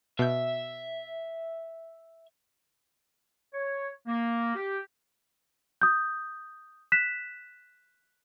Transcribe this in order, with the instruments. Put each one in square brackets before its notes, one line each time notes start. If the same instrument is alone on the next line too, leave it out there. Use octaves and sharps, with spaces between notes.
[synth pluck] B2 G6 [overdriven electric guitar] E5
[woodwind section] C#5
A#3
G4
[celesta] D#6 G6
F#6 B6 E7